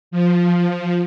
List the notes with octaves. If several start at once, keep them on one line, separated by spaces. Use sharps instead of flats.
F3